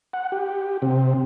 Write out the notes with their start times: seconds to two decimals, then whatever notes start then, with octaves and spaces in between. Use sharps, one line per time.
0.13 F#5
0.32 G4
0.82 C3